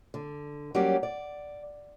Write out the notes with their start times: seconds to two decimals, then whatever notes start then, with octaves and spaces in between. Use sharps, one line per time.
0.14 D3
0.75 F#3 G3 A#3 C#4 G4 D5
1.03 D5